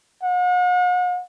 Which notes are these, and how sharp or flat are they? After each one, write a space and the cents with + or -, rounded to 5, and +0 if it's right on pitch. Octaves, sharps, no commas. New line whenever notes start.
F#5 -45